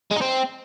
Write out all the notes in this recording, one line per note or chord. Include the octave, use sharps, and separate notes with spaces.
G#3
D#4
C4